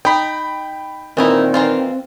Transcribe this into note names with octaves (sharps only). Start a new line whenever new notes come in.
D#4 G5 B5
A#2 D#3 E3 C4 D#4 E4
E3 A#3 F4